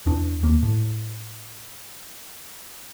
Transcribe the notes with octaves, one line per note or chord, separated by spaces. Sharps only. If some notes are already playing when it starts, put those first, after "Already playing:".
E2 D4
D#2 A#3
A2